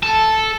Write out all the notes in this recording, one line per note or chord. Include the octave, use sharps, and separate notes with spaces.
A4